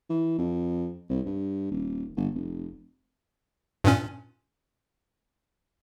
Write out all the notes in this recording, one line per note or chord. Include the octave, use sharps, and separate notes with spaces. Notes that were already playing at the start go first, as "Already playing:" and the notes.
E3
F2
C2
G2
D#1
G1
F1
G2 A#2 C#4